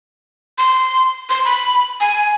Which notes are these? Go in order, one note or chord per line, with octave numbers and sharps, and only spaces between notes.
C6
C6
B5
G#5